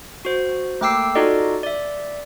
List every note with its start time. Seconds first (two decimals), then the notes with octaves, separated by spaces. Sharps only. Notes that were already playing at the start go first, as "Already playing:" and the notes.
0.25 F#4 C5
0.81 A3 A#3 G5 D6 E6 C7
1.15 D#4 F4 F#4 A4 D5 D#5
1.63 D5 E5